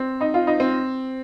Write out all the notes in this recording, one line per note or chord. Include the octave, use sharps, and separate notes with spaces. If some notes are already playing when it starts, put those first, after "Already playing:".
Already playing: C4
D#4
F4
D#4
C4